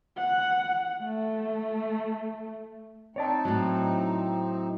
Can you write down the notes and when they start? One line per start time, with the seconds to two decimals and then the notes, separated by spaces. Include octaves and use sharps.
0.17 F#5
1.03 A3
3.16 C4 D#4 C#5 D5 A5
3.45 A2 F#3